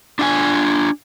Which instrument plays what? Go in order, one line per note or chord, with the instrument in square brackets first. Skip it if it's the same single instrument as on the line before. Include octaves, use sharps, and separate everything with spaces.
[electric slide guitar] D4 F4 F#5 G#5